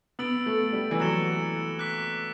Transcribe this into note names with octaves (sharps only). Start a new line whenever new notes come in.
B3 E6 A6 D7 F#7
A3
G3
E3
F#3 A6 C#7 E7 G7
D6 F#6 B6